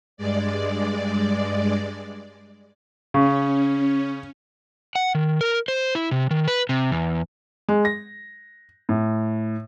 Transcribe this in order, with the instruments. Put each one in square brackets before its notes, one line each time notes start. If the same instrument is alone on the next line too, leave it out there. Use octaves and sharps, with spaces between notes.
[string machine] G2 G#3 D5
[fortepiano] C#3 [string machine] C#4
[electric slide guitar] F#5
D#3
A#4
C5
E4
C3
D#3
B4
C3
E2
[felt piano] G#3
A#6
A2